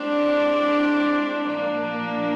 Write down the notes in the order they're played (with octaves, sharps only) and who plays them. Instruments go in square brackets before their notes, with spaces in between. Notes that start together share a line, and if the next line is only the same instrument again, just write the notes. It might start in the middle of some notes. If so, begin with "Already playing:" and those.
Already playing: [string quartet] G#3 C4 E4 G4 [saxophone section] D4
[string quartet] A#2 F3 A#3 [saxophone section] D4